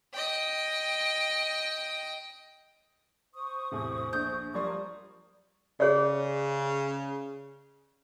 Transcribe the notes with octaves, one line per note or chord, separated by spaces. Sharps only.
D#5 G5
C5 C#6 D#6
E2 A2 C3
A#1 D4 G6
F3 G3 A#4 D5 C6 C#6 D#6
C#3 G#4 C#5 D5